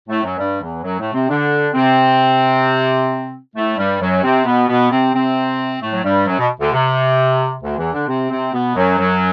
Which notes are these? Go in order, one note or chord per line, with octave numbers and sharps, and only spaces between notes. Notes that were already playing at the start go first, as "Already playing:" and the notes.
A2 A3
F#2 F#3
G2 G3
E2 E3
F#2 F#3
A2 A3
C3 C4
D3 D4
C3 C4
A2 A3
G2 G3
F#2 F#3
C3 C4
B2 B3
B2 B3
C3 C4
C3 C4
A2 A3
F#3
G2 G3
F#2 F#3
B2
D2 D3
C3
D2 D3
E2 E3
D3 D4
C3 C4
C3 C4
B2 B3
F#2 F#3
F#2 F#3